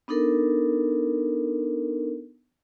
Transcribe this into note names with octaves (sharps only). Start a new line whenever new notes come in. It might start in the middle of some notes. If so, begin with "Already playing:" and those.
B3 D4 D#4 A4 A#4